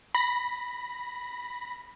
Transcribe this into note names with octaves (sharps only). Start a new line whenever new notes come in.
B5 A#6